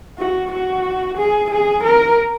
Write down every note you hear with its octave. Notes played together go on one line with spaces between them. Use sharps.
F#4
F#4
G#4
G#4
A#4